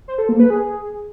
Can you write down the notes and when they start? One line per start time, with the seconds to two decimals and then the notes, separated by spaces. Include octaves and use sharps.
0.08 C5
0.18 A4
0.29 A#3
0.40 B4
0.50 G#4